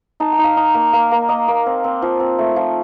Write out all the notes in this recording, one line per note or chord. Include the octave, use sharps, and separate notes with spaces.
D#4 A5
G5
D#4
F5
D#4
A#3
A#3
A#3
A#3 D#5
A#3
C4
C4
F3
C4
A3
F3